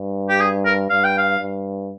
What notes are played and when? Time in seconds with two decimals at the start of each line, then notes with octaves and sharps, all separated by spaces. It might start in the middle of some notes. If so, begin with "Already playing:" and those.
Already playing: G2
0.29 G4
0.40 G#4
0.65 A#4
0.90 G2 F5
1.04 G5
1.18 F5
1.39 G2